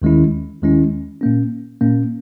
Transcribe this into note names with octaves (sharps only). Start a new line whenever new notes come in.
D#2 D#3 G#3 C#4 E4
D#2 D#3 G#3 C#4 E4
A#2 A#3 C#4
A#2 A#3 C#4